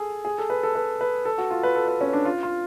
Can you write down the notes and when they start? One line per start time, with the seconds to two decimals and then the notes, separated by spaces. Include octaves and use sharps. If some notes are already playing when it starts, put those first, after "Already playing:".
Already playing: G#4 A4
0.25 G#4
0.38 A4
0.50 B4
0.63 A4
0.75 B4
1.01 B4
1.25 A4
1.38 F#4
1.51 F4
1.63 B4
1.76 A4
1.88 B4
2.01 C#4
2.13 D4
2.25 F4
2.43 F4